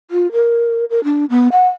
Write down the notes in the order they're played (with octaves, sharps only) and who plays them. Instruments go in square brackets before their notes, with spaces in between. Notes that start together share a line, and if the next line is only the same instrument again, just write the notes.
[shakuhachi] F4
A#4
A#4
D4
B3
F#5